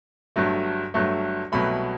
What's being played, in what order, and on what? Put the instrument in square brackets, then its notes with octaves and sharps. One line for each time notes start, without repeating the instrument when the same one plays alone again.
[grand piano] G1 G2 F#3 A3
G1 G2 F#3 A3
C2 B2 F#3 A3 B5